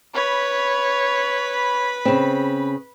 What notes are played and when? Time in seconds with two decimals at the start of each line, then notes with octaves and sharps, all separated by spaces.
0.14 B4 C#5 B5
2.05 C#3 C4